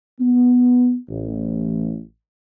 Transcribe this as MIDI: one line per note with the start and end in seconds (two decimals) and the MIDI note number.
0.19 0.94 59
1.08 2.01 33